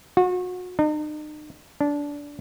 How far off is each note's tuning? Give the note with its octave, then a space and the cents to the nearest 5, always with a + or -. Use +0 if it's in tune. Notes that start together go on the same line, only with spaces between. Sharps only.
F#4 -35
D#4 -45
D4 -20